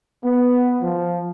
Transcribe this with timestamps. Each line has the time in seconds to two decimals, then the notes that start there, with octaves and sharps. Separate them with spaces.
0.24 B3
0.82 F3